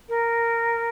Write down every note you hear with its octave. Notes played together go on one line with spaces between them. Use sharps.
A#4